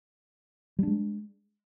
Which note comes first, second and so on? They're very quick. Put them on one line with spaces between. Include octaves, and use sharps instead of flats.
G3 D4 G#3